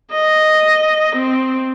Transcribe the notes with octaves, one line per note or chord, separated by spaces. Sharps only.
D#5
C4